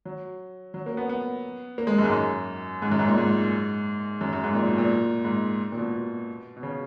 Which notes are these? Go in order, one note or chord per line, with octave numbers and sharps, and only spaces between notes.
F#3
F#3
A#3
B3
B3
A#3
G#3
F#2
G#2
F#2
G#2
F#2
G#2
A#2
G#2
F#2
F#2
G#2
A#2
B2
A#2
G#2
A#2
B2
B2
B2
C#3